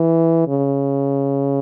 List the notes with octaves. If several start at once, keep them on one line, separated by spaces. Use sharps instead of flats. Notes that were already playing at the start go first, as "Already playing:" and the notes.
Already playing: E3
C#3